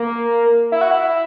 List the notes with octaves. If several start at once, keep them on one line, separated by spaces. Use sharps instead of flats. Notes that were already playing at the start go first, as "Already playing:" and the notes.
Already playing: A#3
E4
F#4
E4